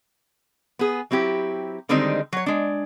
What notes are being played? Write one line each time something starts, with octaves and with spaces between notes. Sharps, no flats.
B3 G#4
F#3 C4 E4 G4
D3 D#3 G3 G#3 C4 D#4
F#3 C#5
G#3 D4